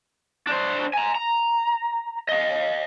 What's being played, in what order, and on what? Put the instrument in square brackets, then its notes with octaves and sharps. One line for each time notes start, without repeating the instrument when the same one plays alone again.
[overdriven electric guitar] D4 C5
G#5 A#5
A#5
D#5 F5